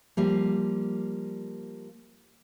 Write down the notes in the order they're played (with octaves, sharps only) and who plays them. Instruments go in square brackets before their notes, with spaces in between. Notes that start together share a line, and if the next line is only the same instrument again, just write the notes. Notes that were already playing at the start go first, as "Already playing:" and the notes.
[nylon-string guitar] F3 G3 A#3